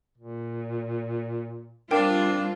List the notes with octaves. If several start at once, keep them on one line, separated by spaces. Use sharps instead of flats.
A#2
G3 C4 D4 F4 A#4 G5